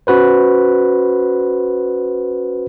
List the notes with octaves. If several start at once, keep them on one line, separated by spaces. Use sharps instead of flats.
C#4 F#4 B4 C5